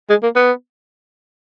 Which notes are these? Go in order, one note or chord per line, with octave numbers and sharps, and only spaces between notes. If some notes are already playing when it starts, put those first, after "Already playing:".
G#3
A#3
B3